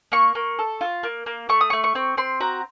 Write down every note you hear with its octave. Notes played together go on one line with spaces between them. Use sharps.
A#3 C#6
A#3
A4
F4
A#3
A#3
A3 C#6
D#6
A3 C#6
C#6
C4
C4 C6
F#4 A#5